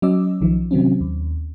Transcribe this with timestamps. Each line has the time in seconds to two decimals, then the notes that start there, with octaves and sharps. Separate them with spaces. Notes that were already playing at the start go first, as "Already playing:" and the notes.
0.02 F#3 C#4 D#5 D6 E6
0.41 B1 D#3 F3
0.71 C3 D#3 F#3 C4 C#4
1.01 D#2